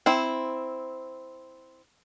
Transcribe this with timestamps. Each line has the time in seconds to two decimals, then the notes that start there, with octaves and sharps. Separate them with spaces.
0.06 C4 E4